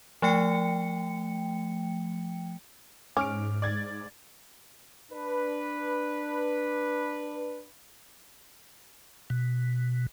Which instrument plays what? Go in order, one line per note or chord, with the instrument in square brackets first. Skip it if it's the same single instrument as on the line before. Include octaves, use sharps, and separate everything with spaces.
[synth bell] F3 A3 G5 C#7
[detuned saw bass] G#2 [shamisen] C#4 [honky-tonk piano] D6 F6 D7
[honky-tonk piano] D5 G#6 A6
[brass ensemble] D4 B4
[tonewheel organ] B2